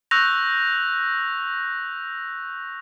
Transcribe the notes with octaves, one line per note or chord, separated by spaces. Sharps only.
C#6 E6 F#6 G6 A#6 F7